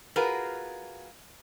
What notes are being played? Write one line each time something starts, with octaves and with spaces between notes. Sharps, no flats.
F4 F#4 G#4 A#4 B4